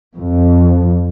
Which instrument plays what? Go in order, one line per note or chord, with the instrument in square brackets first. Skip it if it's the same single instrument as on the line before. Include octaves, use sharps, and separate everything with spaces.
[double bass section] F2